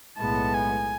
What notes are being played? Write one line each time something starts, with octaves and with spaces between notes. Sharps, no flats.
B1 A2 G#3 B3 A5
G#5